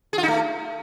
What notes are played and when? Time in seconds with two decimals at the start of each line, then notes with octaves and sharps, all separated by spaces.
0.13 G#4
0.18 F4
0.23 D#4
0.28 A3